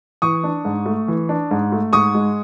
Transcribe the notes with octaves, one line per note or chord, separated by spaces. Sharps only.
E3 C#6 D#6
D4
G#2
A3
E3
D4
G#2
A3
G#2 C#6 D#6
G#3